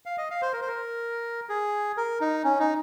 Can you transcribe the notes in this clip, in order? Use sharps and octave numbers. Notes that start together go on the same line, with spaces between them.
F5
D#5
F5
C5
A#4
C5
A#4
G#4
A#4
D#4
C#4
D#4